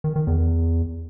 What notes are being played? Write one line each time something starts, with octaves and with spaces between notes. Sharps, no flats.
D#3
D#3
E2